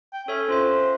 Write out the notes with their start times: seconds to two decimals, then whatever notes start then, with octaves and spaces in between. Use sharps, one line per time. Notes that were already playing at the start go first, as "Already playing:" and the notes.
0.13 G5
0.28 C#4 A4 C#5 E5
0.48 C#4 F4 C5 E5